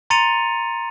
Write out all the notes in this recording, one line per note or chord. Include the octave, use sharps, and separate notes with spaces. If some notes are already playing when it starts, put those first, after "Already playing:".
A#5 C6 A6 C#7 D#7 F7